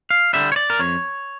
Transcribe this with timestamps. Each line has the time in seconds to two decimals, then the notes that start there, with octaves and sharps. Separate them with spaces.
0.10 F5
0.33 D3 G3 E5
0.52 C#5
0.56 D5
0.70 A#4
0.79 F2 C#5